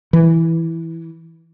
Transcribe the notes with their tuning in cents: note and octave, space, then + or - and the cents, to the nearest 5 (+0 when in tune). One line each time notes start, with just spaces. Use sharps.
E3 -5